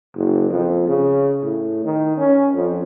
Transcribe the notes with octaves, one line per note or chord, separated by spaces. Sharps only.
F#1
F2
C#3
A2
D#3
C#4
F2